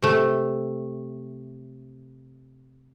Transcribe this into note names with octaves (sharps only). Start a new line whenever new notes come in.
C3 A3